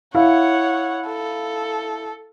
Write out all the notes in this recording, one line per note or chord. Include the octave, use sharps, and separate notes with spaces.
E4 C#5 F5 F#5
A4